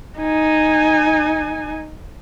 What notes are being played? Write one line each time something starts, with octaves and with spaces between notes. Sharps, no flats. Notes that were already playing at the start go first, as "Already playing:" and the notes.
D#4 G#5